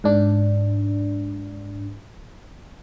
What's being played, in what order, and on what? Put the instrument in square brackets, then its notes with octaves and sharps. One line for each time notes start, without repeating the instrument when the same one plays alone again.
[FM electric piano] G#2 D4